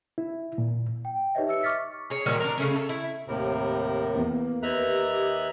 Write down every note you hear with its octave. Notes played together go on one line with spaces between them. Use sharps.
E4
A#2
G5
D#4 G4 B4 C#5 D#5 E5
G4 E5 E6 C#7
C#6 D6 F6 A6 B6 C#7
G#4 C#5
A#2 D#3 F#3 G3
D4 A#4
C#3 A3 C#4
A4
E4
D#2 A2 C3 A#4
E2 A#3 B3
D#2 B4 D#5 E5 A#5 F#6
G4